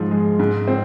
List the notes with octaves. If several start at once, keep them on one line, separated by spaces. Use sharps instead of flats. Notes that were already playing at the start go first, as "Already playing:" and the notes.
Already playing: G#2 F3
G#3
G#2
C4